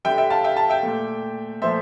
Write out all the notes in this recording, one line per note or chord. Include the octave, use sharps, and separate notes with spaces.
D3 G3 E5 G5
E5 G5
F5 A5
E5 G5
F5 A5
E5 G5
A#2 A3
A#2 F3 A3 C5 E5